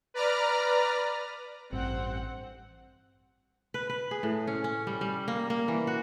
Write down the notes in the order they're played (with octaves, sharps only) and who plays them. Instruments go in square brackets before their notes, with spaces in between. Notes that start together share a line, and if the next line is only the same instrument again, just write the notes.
[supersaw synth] B4 D5 A#5 F6
[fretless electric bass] A1 G2 [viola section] C4 F#5
[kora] B4
B4
G#4
A2
C#4
C#4
G3
G3
A#3
A#3
E3
F#4